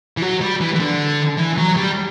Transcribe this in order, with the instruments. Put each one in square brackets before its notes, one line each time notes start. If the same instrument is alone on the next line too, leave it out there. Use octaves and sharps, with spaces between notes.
[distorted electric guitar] E3
F#3
G3
E3
E3
D3
E3
F#3
G3